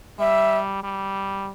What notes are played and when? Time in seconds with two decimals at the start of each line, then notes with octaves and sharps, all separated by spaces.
0.19 G3 E5
0.83 G3